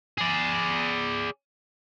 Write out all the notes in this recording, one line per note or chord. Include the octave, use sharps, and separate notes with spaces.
G#4 D5